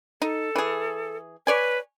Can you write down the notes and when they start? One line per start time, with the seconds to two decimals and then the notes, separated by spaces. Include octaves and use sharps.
0.22 D#4 A4
0.56 E3 G#4
1.47 B4 C#5 D5 G#5